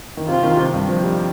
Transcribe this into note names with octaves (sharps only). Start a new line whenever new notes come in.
D#3
C3 F4
D#3
C3
G2
F3
G3